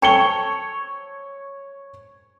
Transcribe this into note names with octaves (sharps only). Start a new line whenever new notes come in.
A4 C#5 G5 C#6 C#7 G7